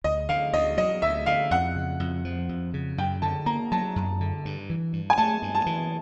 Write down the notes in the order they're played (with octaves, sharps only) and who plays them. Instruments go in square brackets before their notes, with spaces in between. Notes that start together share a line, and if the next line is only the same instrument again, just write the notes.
[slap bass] D2 [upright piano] D#5
[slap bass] D3 [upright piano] F5
[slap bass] D2 [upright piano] D#5
[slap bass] F#3 [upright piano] D#5
[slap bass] D2 [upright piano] E5
[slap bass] D3 [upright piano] F5
[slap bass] F2 [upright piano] F#5
[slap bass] C#3
F2
F3
F2
C#3
[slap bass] F#2 [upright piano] G5
[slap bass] D3 [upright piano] A5
[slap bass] A#3 [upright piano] A#5
[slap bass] F#3 [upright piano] A5
[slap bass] F#2
D3
G2
E3
G2
[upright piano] G#5
[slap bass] A3 [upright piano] A5
[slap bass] G2
[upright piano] A5
[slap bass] E3